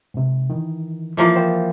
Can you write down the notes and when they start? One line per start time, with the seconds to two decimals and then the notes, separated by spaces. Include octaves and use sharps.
0.14 G#2 C3
0.50 D#3 E3
1.17 E3 F3 A#3
1.35 A#4 C5 G5